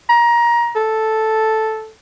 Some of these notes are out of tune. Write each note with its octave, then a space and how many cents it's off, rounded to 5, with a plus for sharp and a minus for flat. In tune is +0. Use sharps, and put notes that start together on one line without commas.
A#5 +20
A4 -5